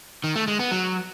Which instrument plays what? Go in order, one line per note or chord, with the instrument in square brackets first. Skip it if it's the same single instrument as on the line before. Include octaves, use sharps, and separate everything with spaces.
[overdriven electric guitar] D#3
A3
G#3
B3
F#3